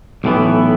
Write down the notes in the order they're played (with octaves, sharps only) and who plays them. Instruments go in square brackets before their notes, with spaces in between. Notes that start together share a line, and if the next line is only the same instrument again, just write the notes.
[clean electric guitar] B1 A2 E3 B3